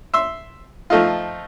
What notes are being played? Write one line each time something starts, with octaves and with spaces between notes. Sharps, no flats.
E5 C6
F3 A3 D#4 F4